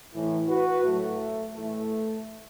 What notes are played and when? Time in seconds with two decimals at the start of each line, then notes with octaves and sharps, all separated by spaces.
0.14 A2 E3
0.49 F#4 B4
0.84 A2 F#3 A3
1.54 A2 E3 A3